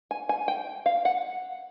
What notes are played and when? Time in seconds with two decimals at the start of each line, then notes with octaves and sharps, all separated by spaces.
0.11 G#5
0.29 G#5
0.48 G5
0.86 F5
1.05 F#5